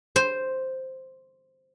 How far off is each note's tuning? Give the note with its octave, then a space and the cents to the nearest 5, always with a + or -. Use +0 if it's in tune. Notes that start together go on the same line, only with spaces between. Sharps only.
C5 +0